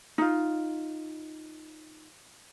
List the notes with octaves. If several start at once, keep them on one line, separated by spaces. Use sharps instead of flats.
D#4 F4